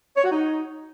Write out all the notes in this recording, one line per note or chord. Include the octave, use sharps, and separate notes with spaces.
C#5
F#4
D#4